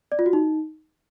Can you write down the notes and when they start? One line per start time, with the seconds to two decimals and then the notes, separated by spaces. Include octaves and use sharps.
0.12 D5
0.19 F4
0.26 F#4
0.33 D#4